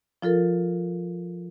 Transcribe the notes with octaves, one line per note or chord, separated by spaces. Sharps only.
F3 F4 A4 A#4